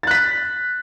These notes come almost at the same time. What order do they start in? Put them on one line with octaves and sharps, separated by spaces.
A6 F#6 B6